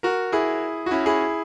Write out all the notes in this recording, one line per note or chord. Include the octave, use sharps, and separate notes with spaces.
F#4 A#4
E4 G#4
F#4
C#4 E4
E4 G#4